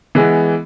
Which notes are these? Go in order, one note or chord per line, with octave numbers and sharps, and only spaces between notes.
E3 G#3 B3